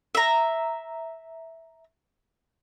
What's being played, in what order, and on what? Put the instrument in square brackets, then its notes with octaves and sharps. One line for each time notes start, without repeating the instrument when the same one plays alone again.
[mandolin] E5 A#5